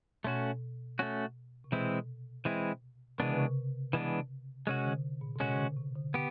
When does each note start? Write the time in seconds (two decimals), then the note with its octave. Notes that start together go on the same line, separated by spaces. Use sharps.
0.24 B2 A3 C#4 F#4
0.99 A3 C#4 F#4
1.64 C3
1.72 B2 E3 G#3 C4 E4
2.45 E3 G#3 C4 E4
3.19 C3 E3 G#3 B3 D4
3.29 C#3
3.39 C3
3.93 E3 G#3 B3 D4
4.67 C3 G#3 C#4 F#4
4.85 D3
5.21 A#2
5.36 B2
5.40 C3 G#3 C#4 F#4
5.54 D3
5.59 C#3
5.77 C3
5.96 D3
6.14 D3 B3 G4